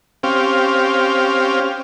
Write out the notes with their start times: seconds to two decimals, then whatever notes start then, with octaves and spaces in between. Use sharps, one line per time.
0.23 C4 C#4 G4 F5